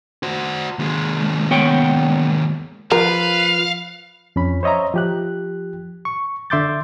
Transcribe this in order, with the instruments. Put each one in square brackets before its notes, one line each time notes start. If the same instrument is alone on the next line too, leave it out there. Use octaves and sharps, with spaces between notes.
[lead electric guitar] F#4 C5
D#2 G#3
[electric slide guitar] B3 C#5 G5
[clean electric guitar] F3 F4 [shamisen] A#4 [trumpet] B4 [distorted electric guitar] F5
[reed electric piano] F2 C#4 B5
C5 C#5 D#5 E5 A#5
F3 G4 F#6
C#6
D3 E5 C6 D6 G6 A6